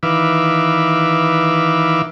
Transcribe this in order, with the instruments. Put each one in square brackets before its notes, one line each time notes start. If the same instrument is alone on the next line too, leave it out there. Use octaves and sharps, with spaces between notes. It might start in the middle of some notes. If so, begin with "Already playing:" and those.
[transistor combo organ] D#3 E3 B4 E5 F5 D6